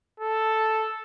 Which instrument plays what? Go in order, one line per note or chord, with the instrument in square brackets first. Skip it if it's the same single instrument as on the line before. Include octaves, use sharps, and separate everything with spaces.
[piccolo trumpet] A4